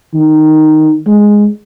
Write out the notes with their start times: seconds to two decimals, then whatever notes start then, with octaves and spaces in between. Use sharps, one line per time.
0.14 D#3
1.07 G#3